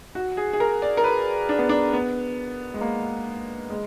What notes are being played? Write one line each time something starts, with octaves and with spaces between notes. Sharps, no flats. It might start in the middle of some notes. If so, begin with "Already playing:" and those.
F#4
G#4
G#4
A#4
D5
A#4
B4
D4
B3
D4
B3
G#3
A#3
G#3